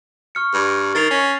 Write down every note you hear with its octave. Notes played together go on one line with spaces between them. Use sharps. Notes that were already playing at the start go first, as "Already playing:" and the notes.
C#6 F6 C#7
G2
D#3 A6 C7 F7
C#4